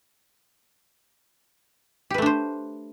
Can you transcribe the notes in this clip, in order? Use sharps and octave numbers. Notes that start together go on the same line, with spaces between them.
A3 D4 G4 B4 C5